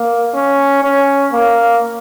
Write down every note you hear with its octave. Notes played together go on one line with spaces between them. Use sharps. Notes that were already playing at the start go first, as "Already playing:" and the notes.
Already playing: A#3
C#4
C#4
A#3